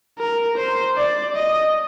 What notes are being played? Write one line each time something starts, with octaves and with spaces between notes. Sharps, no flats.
A#4
C5
D5
D#5